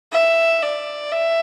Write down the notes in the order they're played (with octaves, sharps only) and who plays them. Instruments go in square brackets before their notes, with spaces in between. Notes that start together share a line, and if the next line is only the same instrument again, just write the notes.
[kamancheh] E5
D5
E5